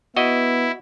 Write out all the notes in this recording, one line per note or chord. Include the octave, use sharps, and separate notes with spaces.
B3 E4 F#4 D#5